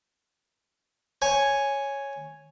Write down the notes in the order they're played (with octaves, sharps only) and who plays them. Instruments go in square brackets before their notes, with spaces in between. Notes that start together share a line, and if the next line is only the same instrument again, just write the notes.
[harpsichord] C#5 G#5